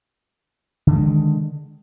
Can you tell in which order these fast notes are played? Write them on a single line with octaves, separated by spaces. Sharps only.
D3 D#3 G#3